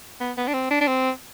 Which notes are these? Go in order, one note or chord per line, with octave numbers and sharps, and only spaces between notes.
B3
B3
D4
C4
D4
D4
C4